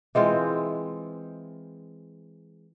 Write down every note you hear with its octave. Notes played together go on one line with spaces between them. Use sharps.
E3 G#3 C4 F4